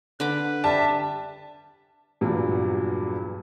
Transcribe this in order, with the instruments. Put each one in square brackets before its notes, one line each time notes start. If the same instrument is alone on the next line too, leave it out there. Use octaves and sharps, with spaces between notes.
[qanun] D3 B5 D6 [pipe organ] B4
[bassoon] G3 [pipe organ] E5 [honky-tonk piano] A5
[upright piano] E2 G2 A#2 F#3